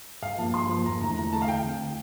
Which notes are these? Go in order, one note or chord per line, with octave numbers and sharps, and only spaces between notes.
G2 F5
F3 A#3 A5
G2 C6
F3 A#3
E2 A#5
D3 A3 E4 A#5
E2 A#5
D3 A3 E4 A5
F5
D2 G5
D3 A3 C4